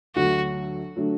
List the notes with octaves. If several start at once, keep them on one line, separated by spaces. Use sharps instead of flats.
D2 D3 F#3 A3 D4 F#4
D3 F#3 A3 D4